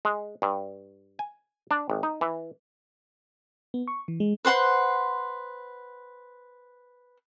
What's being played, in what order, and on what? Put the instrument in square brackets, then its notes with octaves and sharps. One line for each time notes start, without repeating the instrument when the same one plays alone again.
[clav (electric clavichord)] G#3
G2
G#5
D4
G#1
D#4
E3
[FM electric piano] B3
C#6
E3
G#3
[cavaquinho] B4 C5 F#5 C6